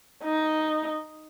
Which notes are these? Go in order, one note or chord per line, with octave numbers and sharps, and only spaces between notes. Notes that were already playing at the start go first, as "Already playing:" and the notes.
D#4